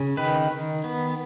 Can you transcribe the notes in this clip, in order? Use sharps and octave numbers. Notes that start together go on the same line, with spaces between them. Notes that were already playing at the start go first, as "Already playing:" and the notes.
Already playing: C#3
D#3 B4
D#3
B3